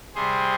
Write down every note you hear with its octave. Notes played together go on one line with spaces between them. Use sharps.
C3 G3 C4 G#4 C5